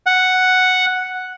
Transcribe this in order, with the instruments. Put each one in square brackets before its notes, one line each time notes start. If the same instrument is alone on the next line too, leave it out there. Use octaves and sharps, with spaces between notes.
[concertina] F#5